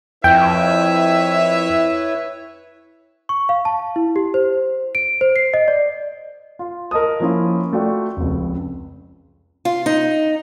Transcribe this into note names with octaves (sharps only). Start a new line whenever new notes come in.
F2 E4 B4 C#5 E5 G5
C#6
F5
A5
E4
G4
C5
D7
C5
C7
D#5
D5
F4
A#4 D#5 A5 D#6
F3 A#3 C#4 E4 F4
A3 F4 F#4 D5 G5
F1 C#2
F4
D#4